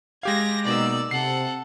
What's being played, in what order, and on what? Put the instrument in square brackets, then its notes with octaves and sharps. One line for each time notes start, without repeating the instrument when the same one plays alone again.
[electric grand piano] G#3 G4 F5 [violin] G#6 A#6
[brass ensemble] B2 A#3 D#4 [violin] D5 E6
[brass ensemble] C3 [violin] A4 F#5 [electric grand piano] C7